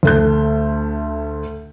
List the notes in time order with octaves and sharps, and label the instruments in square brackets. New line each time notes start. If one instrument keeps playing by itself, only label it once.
[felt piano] D2 A3 G6